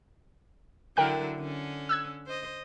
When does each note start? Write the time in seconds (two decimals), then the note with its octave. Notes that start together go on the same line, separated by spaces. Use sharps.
0.97 D3 F#3 E4 A#4 G5 F#6
1.37 D3 C#4
1.89 E6 F#6 G#6
2.26 C5 D#5